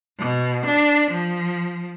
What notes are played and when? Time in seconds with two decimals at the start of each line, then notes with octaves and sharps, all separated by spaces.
0.19 B2
0.66 D4
1.11 F3